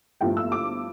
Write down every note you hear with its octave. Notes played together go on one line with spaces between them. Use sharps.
G1 G2 F3 A3 E4 G5
E6
D6